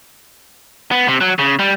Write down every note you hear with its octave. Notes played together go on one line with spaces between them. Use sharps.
B3
C3
F#3
C#3
G3